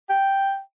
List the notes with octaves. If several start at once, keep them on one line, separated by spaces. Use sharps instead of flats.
G5